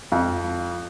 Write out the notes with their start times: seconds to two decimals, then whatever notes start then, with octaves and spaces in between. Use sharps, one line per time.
0.12 F2